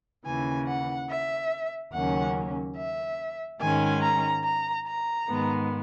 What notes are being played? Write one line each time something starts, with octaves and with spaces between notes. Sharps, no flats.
D#2 C#3 E3 G#5
F#5
E5
D#2 C#3 F#3 A#3 C#4 F#5
E5
G#2 D#3 G#3 C#4 G#5
A#5
A#5
A#5
G#2 D#3 G#3 B3